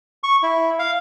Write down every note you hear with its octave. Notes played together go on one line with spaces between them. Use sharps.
C#6
E4
F5